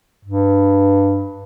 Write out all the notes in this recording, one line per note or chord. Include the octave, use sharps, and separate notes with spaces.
G2